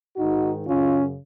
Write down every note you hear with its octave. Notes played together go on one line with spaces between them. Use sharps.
G#2 D#3 D#4 F#4
F#2 C#3 C#4 F4